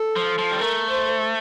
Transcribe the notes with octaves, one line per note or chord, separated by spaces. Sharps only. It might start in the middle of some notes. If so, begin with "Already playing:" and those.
Already playing: A4
F3
F3
G3
A3 A#4
C5